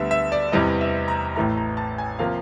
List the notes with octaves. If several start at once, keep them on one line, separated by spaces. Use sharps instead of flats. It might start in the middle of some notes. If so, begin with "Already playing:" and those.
Already playing: D2 D3 G3 B3 E5
E5
D5
E2 C3 E3 G3 D#5
E5
A#5
A1 A2 E3 A3 A#5
A#5
A5
G#5
C3 F3 A#3 F5